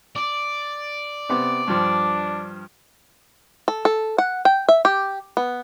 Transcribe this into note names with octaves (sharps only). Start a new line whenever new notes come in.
D5
C3 B3 D6
G2 F3 D4
A4
A4
F#5
G5
E5
G4
B3